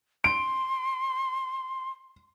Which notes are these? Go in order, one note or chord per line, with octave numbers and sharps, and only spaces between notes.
C6 D7